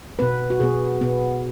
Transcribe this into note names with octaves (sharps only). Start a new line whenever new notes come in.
B2 B3 B4
F#4
B2 B3 G#4
B2 B3